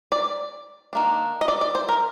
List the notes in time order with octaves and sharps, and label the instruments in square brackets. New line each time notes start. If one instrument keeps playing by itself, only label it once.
[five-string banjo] D5
D#3 A#3 D4
D#5
D5
D5
C5
A#4